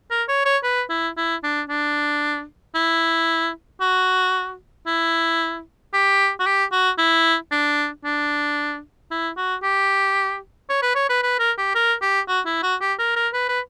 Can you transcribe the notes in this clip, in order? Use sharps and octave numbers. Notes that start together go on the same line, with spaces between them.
A#4
C#5
C#5
B4
E4
E4
D4
D4
E4
F#4
E4
G4
F#4
G4
F#4
E4
D4
D4
E4
F#4
G4
C#5
B4
C#5
B4
B4
A#4
G4
A#4
G4
F#4
E4
F#4
G4
A#4
A#4
B4
B4